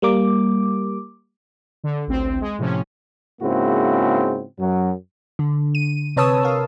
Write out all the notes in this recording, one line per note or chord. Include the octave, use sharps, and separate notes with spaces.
G3 A#3 D6
D3
A1 D2 C4
G#3
A2 C3 F3 C#4
G#2 C#3 A#3 C4 E4 F#4
F#2 F#3
D3
D#7
C3 B4 C#5 A5 D#6 E6
A#4 F5